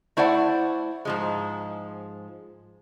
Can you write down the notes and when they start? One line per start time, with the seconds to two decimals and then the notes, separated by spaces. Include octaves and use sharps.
0.17 A3 E4 C5 D5 F#5
1.05 G#2 F3 G#3